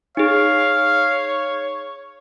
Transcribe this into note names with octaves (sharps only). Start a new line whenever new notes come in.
D#4 G#4 C#5 F5